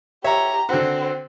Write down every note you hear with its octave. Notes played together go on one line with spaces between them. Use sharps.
G4 C#5 E5 A#5
D3 C4 F#4